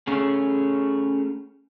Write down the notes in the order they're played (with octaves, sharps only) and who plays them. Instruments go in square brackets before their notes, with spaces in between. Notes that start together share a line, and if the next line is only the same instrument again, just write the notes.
[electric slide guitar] A3 C#4 G#4